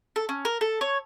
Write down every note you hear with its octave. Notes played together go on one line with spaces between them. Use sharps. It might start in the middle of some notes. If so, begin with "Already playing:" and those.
A4
C#4
A#4
A4
C#5